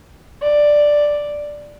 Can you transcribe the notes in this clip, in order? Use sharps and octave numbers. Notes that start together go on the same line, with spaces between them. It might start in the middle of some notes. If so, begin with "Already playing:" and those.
D5